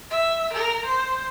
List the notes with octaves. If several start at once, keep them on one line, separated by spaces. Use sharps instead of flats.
E5
A#4
C5